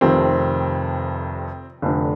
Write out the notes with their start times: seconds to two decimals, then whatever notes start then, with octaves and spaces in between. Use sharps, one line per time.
0.01 F1 F2 C3 D#3 C4
1.82 F1 F2 D3